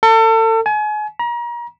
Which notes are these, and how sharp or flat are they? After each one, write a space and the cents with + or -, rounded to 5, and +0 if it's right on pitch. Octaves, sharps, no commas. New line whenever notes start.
A4 +35
G#5 +35
A#5 +35